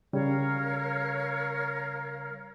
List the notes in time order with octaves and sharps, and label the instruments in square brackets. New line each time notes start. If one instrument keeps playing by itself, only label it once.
[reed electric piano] C#3 G3 [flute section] A#4 C#5 F5